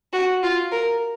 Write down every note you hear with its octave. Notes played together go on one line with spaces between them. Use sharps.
F#4
F4
A#4